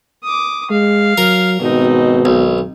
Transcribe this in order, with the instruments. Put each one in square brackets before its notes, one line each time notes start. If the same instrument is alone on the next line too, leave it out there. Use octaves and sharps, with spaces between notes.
[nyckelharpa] D6 D#6
[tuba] G#3 [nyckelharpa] F5
[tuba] F#3 [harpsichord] A#4
[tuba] G#1 [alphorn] B2 [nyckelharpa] C4 D#4
[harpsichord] B1